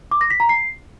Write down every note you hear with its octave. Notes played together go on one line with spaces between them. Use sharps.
D6
A#6
B6
A#5
C7